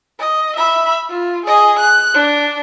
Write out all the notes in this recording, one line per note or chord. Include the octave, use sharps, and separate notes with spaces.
D#5
E5 B5
F4
G#4 D#5
F#6
D4